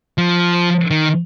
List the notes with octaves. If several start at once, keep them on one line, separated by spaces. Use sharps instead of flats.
F3
D#3